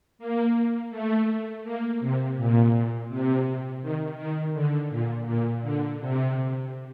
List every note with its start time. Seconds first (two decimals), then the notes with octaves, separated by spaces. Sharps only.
0.19 A#3
0.90 A3
1.64 A#3
2.00 C3
2.36 A#2
3.09 C3
3.82 D#3
4.17 D#3
4.54 D3
4.90 A#2
5.26 A#2
5.63 D3
6.00 C3